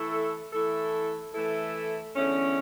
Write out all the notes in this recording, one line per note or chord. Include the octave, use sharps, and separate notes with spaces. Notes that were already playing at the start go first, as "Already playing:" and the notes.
Already playing: E3 A3 E4 A4
E3 A3 E4 A4
E3 A3 E4 A4
E2 D3 A3 C#4